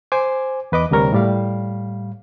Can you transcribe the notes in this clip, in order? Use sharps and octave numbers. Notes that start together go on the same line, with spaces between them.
C5 G#5 D6
E2 B4 D#5 D6
D2 C3 G3 A#4 C#5
A2 G3 F5